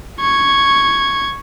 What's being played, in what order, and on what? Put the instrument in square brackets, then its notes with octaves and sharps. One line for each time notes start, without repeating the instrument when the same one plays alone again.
[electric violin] C#6 G#6